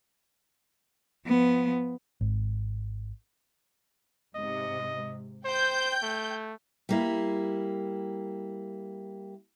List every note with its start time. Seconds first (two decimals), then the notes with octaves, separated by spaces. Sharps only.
1.27 F3 B3
2.21 G#1
4.35 G#2 C3 D#5
5.45 C5 G5 G6
6.03 A3
6.89 G3 A#3 E4